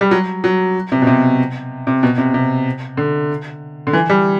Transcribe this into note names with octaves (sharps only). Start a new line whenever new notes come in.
G3
F#3
F#3
C3
B2
C3
C3
B2
C3
C3
D3
D3
E3
G3